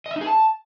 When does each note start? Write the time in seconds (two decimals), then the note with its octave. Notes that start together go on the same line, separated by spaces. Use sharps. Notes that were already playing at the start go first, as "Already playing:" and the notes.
0.06 D#5
0.11 E5
0.16 D#4
0.21 G#4
0.26 A5